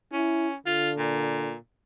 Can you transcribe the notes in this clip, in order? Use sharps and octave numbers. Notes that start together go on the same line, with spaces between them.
C#4 E4
D3 F4
A#2